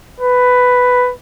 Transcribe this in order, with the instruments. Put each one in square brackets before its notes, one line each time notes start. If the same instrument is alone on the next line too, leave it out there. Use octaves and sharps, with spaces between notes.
[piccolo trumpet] B4